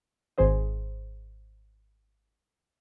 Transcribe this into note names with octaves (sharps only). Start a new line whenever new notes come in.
G#1 G#4 C5 D#5